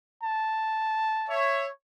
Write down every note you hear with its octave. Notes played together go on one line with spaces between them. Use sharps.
A5
C#5 E5